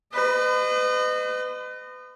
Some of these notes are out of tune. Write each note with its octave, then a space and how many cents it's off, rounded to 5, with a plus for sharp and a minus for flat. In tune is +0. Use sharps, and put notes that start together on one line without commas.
B4 +40 D#5 -25